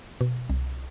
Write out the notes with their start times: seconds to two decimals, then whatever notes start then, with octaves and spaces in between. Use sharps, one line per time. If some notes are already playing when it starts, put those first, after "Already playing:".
0.21 B2
0.50 C2